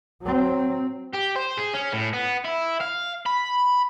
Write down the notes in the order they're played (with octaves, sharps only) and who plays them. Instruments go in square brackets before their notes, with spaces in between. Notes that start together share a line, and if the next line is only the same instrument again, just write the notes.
[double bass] F#3 C4
[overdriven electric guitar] G4
C5
G#4
C#4
A2
B3
E4
F5
B5